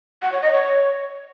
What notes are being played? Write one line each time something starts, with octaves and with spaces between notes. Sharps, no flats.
F#5
C#5
D#5
C#5